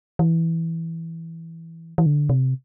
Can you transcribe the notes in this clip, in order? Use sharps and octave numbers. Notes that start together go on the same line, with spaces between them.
E3
E3
D3
C3